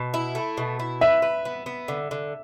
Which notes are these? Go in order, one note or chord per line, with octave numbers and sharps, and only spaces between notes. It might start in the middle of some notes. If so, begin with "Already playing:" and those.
Already playing: B2
E4
A3
B2
E4
B4 E5
B4
B3
B3
D3
D3